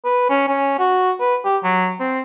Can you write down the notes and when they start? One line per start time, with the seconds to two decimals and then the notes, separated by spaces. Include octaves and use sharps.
0.05 B4
0.29 C#4
0.48 C#4
0.79 F#4
1.20 B4
1.45 G4
1.63 F#3
2.00 C4